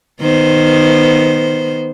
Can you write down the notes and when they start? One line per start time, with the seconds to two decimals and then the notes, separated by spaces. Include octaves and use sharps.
0.20 D#3 B3 C5